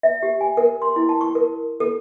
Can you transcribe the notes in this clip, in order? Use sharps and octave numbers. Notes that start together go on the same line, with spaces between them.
E5
G4
G#5
A#4
C6
E4
A5
C#6
A#4
A4